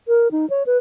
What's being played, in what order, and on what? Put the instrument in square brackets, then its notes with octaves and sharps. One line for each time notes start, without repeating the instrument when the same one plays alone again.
[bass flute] A#4
D#4
C#5
B4